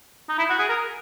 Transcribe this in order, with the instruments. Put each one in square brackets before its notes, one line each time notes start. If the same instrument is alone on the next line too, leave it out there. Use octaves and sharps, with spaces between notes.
[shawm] D#4
E4
F#4
G#4
A#4